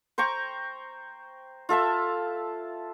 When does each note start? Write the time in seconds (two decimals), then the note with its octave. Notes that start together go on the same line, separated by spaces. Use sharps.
0.18 C5 G5 A#5 C#6
1.69 F4 A4 E5 A5